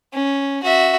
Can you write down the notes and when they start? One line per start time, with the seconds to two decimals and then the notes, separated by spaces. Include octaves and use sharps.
0.13 C#4
0.63 F#4 E5